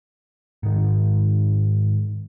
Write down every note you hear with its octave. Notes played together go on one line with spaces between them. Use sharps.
G#2 D#3